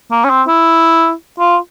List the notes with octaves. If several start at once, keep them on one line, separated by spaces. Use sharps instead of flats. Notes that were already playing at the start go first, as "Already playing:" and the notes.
A#3
C#4
C4
E4
F4